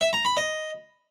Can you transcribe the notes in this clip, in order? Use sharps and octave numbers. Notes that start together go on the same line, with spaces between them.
E5
A#5
B5
D#5